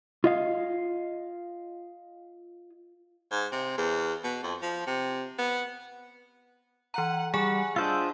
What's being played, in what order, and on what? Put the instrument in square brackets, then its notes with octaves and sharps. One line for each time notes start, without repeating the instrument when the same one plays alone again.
[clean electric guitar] F4 D#5 F5
[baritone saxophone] G#2
C3
E2
B2
F2
F3
C3
B3
[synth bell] E3 A#5 [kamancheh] F#5
[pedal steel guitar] G3 [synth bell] G#4 G#5 [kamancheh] F#5
[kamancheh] D4 [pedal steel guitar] F4 C5 D#5 [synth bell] E6